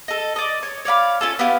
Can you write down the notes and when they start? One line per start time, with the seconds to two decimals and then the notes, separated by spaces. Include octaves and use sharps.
0.08 A4 D#5
0.36 D5 D#5
0.63 C#5
0.85 C#5 D5 F5 B5
1.21 C#4 F4 A4
1.39 B3 E4 G4 F5